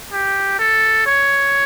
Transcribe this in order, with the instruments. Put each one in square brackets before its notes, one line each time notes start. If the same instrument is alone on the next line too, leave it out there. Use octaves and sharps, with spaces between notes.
[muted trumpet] G4
A4
C#5